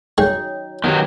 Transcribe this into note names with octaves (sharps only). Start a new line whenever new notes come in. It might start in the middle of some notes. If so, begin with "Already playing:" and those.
F#3 G#3 D#4 C#5 G5
D#3 F#3 B3 G4